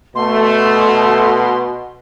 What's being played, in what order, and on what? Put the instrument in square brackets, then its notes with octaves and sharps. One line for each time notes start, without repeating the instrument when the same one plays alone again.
[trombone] B2 [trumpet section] A3 [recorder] C6